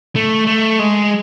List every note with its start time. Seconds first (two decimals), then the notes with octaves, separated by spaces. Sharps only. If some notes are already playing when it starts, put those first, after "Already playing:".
0.16 A3
0.47 A3
0.79 G#3